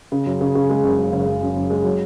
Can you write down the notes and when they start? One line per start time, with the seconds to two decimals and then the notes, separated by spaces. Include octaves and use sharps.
0.12 C#3
0.26 F#2
0.41 C#3
0.55 C#3
0.69 G#3
0.84 F#1
0.98 F#2
1.12 F#1
1.27 F#1
1.42 F#2
1.55 F#1
1.70 G#3
1.84 F#3